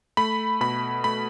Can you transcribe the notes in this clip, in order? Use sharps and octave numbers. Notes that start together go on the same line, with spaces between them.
A3 B5
B2 B5
A3 B5